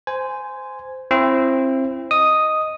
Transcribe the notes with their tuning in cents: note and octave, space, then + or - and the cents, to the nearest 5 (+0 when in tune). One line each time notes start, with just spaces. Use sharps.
C5 -15 G#5 +0
C4 +20 E4 +30
D#5 +0 D#6 +0